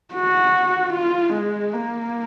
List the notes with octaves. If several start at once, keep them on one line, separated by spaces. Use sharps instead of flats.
F#4
F4
G#3
A#3